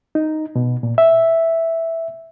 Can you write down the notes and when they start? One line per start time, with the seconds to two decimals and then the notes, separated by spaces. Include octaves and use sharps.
0.15 D#4
0.56 B2
0.83 A#2
0.98 E5